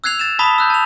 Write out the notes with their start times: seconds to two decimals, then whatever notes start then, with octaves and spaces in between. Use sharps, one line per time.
0.04 E6 F#6 G#6 C7 F7
0.19 A6 E7
0.39 A5 B5 D#6 B6 G7
0.58 E6 F#6 G6
0.70 A5 F7